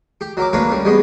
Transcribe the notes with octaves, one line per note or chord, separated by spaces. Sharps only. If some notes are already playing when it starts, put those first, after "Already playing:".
G4
F#3 A#4 D6
A#3 D4 A#4 B4 C#5
G3 C#4
G3 G#3 B3 C#4